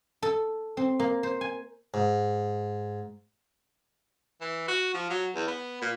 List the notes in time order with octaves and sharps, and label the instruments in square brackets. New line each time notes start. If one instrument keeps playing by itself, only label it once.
[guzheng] A4
C4
A#3
C5
G#5
[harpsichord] G#2
[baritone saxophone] E3
F#4
F3
F#3
E2
B3
A#2